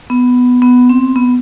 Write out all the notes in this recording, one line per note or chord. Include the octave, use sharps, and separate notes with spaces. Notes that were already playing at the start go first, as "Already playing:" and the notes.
B3
B3
C4
B3